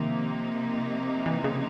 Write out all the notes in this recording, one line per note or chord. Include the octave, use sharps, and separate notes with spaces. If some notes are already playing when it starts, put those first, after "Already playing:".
Already playing: C3 D#3 F3 A#3 D#4
E3
C#3